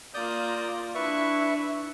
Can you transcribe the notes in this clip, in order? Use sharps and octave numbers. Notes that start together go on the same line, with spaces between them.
A#3 F4 D5 D#6 G6
D4 E4 B4 E5 C#6